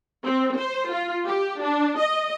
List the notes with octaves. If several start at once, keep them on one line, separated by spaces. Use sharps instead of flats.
C4
C5
F4
G4
D4
D#5